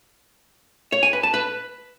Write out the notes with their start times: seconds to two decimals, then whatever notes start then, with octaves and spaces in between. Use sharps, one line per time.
0.92 C#5
1.03 G#5
1.13 B4
1.23 A5
1.34 B4